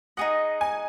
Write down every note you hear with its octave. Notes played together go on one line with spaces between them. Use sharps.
D#4 G#4 D#5 F#5
G#5